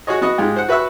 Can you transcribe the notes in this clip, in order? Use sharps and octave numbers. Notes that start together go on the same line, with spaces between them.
F#4 G#4 C#5 D#5
B3 F#4 D#5
G#2 G#3 F4 G4
C5 F#5
F#4 B4 E5 C#6 E6 F#6